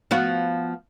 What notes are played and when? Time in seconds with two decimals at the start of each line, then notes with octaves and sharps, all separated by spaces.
0.11 F3 B3 F#4